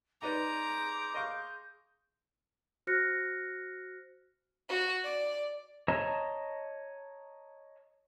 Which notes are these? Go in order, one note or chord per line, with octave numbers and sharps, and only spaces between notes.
D#4 G#4 B4 D5 A#5 C6 D6 G6
D#5 F5 C#6
F#4 C5 F6 F#6 A#6 C#7
F#4
D5
C#5 D#5 A5 A#5